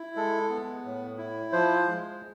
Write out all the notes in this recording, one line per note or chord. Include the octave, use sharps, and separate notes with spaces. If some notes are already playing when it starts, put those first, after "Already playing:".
Already playing: E4
G#3 A4
B3
A2
E4
F3 C5
G#3